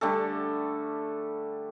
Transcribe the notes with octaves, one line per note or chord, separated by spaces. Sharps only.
D3 G3 A3 A4